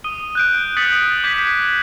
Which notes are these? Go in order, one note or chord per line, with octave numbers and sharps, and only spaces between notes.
D#6 D#7 G7
F#6 G6 D7
D#6 A6 B6 C#7 F#7
D6 G6 G#6 B6